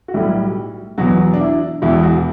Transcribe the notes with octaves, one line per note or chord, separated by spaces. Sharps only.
F#4
B1 A2 G3 E4
E2 B2 F#3 F#4
D4
E4
E1 E2 B2 E4
F#4